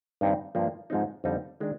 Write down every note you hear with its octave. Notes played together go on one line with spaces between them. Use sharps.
G2 D#3 G3 C4 D#4
G2 F3 A#3
G#2 F3 G#3 C4 D#4
F2 D3 G3 C4 D#4
D#3 G#3 D4